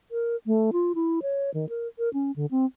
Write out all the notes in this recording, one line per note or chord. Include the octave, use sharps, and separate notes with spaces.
A#4
A3
F4
E4
C#5
D#3
A#4
A#4
C#4
D3
C4